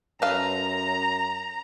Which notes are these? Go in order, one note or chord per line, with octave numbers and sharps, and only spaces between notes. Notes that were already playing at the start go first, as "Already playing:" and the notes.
F#2 A4 B4 F5 A#5